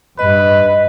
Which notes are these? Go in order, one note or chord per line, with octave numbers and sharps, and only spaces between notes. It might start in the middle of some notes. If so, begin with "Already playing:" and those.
G2 B4 D#5